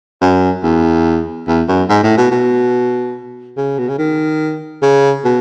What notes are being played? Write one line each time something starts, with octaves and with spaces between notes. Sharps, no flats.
F#2
E2
E2
F#2
G#2
A2
B2
B2
C#3
B2
C#3
D#3
C#3
B2